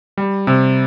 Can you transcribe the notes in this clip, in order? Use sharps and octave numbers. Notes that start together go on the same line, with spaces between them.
G3
C3